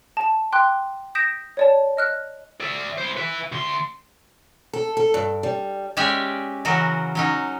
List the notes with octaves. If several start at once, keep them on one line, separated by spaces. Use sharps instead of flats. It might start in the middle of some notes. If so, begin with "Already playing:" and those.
A5 E7
G5 C6 D6 F#6
D#6 G6 A#6 B6 D7 E7
C#5 D5 A5
D#5 F6 F#6
D5 E5
E4 C5
B4 E5
D2 C6
A4
A4
G2
G3
G#3 C#4 G4 D5 E5 G#5
C#3 E3 F#3 F#4 A#4
F#3 C#4 D#4